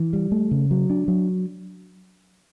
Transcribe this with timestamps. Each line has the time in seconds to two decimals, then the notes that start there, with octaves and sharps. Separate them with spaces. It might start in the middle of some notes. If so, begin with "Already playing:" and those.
Already playing: E3
0.13 G3
0.32 A3
0.51 C#3
0.71 F#3
0.90 D4
1.08 F#3